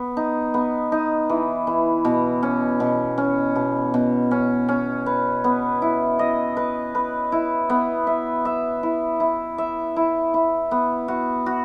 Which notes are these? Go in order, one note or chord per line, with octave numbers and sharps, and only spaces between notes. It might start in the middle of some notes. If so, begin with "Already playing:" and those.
Already playing: B3
D#4
B3
D#4
E3
E3
B2
C#4
B2
C#4
B2
B2
C#4
C#4
B4
B3
E4
D#5
B4
B4
E4
B3
E5
E5
E4
E4
E5
E4
E4
B3
F#4
F#4